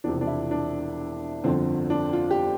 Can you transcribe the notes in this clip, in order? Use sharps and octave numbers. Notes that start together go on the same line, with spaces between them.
E1 E2 C3 F3 D4
D4
E4
D4
G1 F2 D3 F3 C4
D4
F4
G4